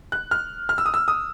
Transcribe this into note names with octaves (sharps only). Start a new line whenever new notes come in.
F#6
F6
F6
E6
D#6
E6
D#6